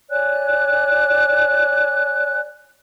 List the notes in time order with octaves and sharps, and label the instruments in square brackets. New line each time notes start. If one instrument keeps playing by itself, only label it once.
[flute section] C#5 D5 G#5 F#6